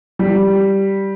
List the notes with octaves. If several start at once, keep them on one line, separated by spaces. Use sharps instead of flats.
G3